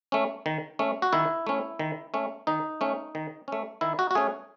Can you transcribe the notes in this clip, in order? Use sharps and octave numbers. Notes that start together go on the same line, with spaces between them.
A3 C#4
D#3
A3 C#4
F#4
D#3 E4
A3 C#4
D#3
A3 C#4
D#3 D#4
A3 C#4
D#3
A3 C#4
D#3 E4
F#4
F#4
A3 C#4 G#4